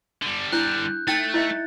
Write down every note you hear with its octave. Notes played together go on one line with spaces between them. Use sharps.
D3 G3
D4 E4 F#6 G6
A3 D#4 G5 A6
E4 D#5 E5